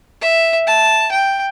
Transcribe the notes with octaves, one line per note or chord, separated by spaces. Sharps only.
E5
A5
G5